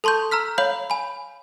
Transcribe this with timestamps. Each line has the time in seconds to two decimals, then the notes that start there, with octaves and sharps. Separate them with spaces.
0.04 A4 A5 C6 C#6 G6
0.31 A#5 E6 F6 B6
0.58 C#5 F5 B5 G6 F#7
0.90 G#5 B5